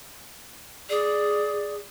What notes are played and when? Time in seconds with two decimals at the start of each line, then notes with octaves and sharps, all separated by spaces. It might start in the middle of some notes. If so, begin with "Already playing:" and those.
0.90 G#4 D5